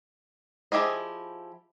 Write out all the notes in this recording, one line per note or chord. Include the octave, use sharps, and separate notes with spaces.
F3 E4 G4 G#4 D#5